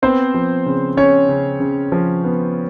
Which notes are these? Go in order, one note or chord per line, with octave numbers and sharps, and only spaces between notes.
B3 C4 C5
F3
C#3
C#3 C#4 C#5
C#3
C#3
F3
B3